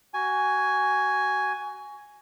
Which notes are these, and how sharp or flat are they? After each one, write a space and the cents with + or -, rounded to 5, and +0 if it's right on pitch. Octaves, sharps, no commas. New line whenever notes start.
F#4 +20 G#5 +0